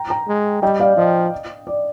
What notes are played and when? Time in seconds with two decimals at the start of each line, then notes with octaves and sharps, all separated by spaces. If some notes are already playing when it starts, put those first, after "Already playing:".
Already playing: G5 A#5
0.10 G5 A#5
0.28 G#3
0.62 G3 D#5 G5
0.80 D5 F5
0.97 F3 D#5
1.67 D5